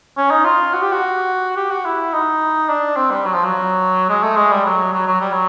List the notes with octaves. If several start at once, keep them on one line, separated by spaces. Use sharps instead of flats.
C#4
D#4
F4
F#4
G4
F#4
G4
F#4
E4
D#4
D4
C4
G3
F#3
F3
F#3
G#3
A3
G#3
G3
F#3
F#3
F#3
G3
F#3